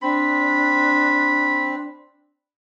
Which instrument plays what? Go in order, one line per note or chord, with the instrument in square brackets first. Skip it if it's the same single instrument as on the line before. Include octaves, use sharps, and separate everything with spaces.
[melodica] C4 [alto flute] D4 [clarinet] B5